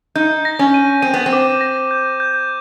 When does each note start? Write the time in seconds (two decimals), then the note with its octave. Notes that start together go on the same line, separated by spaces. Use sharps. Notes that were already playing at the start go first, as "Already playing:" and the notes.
0.15 D#4 G6
0.45 A#6
0.59 C#4
0.74 D#7
1.02 C4 D#7
1.14 B3
1.26 C4
1.33 D6
1.61 A#6
1.91 G6
2.20 G6